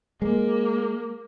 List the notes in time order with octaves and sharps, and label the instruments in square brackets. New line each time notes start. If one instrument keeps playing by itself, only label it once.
[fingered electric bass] G#3 [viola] A#3